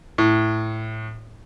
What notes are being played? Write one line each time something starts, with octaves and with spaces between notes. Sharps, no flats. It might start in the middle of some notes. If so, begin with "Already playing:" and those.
A2